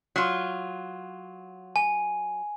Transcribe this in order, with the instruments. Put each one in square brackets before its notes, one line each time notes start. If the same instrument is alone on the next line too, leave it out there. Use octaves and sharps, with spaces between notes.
[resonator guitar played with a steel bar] F#3 F4
[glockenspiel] G#5